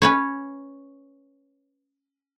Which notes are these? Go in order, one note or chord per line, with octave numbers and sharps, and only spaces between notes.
C#4 B4 C#5